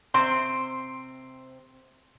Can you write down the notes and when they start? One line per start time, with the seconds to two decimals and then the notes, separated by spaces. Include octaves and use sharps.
0.14 C3 C4 C5 C6